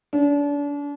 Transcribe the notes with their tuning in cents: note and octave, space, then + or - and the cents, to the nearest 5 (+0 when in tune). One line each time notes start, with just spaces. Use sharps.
D4 -35